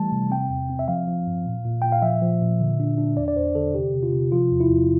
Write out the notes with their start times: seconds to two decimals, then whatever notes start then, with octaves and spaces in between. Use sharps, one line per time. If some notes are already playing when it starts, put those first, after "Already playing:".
Already playing: E3 G3 A3 A5
0.12 C3
0.31 C4 G5
0.50 E2
0.70 C4
0.79 E5
0.88 F3 F5
1.07 F3
1.27 G2
1.46 A#2
1.65 A#2
1.82 A#2 G5
1.92 F5
2.02 F3 E5
2.21 F3
2.41 A#2
2.60 D3
2.80 D4
2.98 D4
3.17 E2 D5
3.28 D5
3.36 E2 C5
3.55 D3 A4
3.74 C3 G4
3.93 C3
4.03 F4
4.12 C3
4.32 F3 F4
4.51 E2
4.60 E4
4.69 E2